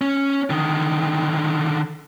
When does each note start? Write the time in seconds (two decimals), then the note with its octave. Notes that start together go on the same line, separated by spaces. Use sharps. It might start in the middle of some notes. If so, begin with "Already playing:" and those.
0.01 C#4
0.50 D3 D#3